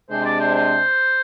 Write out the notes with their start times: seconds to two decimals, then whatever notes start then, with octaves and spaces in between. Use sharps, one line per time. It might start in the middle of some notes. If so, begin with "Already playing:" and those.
0.10 C3 G#3 D4 C5
0.25 D5
0.40 C5
0.54 C5